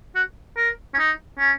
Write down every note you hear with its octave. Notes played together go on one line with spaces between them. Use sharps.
F#4
A#4
C#4
D#4
C#4